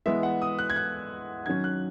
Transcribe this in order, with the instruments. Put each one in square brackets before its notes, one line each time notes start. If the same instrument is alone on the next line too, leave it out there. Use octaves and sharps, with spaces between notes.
[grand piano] E3 G#3 B3 E5
F#5
D#6
F#6
G#6
F#6
D#3 F#3 C#4 G#6
F#6